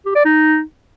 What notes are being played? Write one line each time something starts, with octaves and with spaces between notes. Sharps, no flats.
G4
D5
D#4